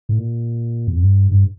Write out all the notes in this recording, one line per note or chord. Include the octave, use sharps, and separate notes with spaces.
A2
A#2
E2
F2
G2
G2